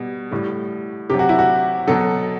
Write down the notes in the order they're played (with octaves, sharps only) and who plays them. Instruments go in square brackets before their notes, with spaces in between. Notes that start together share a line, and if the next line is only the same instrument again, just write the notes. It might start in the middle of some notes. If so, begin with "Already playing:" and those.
Already playing: [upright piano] B2 G3
A2 G3
C3 F#3 G4
F#4
E4
F#4
B2 F#3 A4